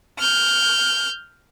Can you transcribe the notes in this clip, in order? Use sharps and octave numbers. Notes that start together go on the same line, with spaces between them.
F6 G6